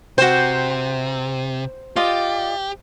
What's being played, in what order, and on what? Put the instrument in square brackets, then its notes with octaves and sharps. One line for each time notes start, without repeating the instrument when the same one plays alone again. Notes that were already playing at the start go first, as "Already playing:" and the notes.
[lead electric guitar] C3 [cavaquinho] F#4 G5 [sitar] C5
[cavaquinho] F4 D5 D#5 [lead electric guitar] G4